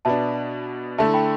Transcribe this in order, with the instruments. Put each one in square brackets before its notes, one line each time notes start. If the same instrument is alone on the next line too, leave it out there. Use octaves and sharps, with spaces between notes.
[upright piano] B2 B3 D4 [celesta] E5 A5
[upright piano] D3 A3 E4 [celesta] E5 A5
[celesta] G5 B5